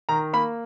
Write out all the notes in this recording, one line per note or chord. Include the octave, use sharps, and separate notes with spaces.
D#3 A#5
A#3 B5